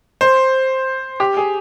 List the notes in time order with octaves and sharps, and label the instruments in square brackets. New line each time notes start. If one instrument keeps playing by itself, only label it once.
[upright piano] C5
G4
G#4